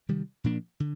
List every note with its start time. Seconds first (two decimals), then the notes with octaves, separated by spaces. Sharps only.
0.09 C3 D#3 G3
0.44 A#2 F3 A#3 D4
0.80 D3